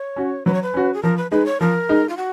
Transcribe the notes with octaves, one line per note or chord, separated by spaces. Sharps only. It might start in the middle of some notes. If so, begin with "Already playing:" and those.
Already playing: C#5
C#4 F#4
F#3 B4
C#5
B4
C#4 F#4
G#4
F3 A#4
B4
G#3 D#4 B4
C#5
F3 A#4
G#3 D#4
F4
F#4